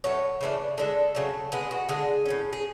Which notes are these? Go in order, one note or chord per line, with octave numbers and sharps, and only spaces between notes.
A2 F#3 A3 C#5
C#3 E3 A3 D4
D3 G#3 D4 A4
C#3 F#3 A3
D3 G#3 B3 G#4
F#4
D3 G#3 D4 G#4
A2 F#3 C#4
G#4